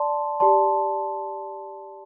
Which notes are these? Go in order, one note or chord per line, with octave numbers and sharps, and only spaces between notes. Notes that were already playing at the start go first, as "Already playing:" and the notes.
Already playing: D5 A5 C6
G4 D5 A5 C6